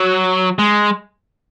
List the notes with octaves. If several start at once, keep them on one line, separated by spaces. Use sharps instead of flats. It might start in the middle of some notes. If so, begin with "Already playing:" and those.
Already playing: F#3
G#3